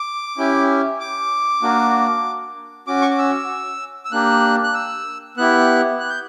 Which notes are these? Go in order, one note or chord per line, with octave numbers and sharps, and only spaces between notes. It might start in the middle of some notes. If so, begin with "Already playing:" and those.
Already playing: D6
C#4 E4 G4
D6
A#3 D4 F#4
C#4 F#4 D6
C#6
D6
E6
E6
A#3 D4 G4 F#6
F#6
E6
B3 E4 G4 F#6
F#6
G6